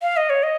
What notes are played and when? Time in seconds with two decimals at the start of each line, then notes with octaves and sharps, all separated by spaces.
0.02 F5
0.17 D#5
0.30 C#5
0.43 D#5